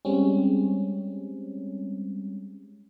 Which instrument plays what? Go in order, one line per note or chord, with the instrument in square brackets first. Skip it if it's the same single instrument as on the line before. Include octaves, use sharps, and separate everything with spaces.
[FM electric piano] G3 G#3 C4 C#4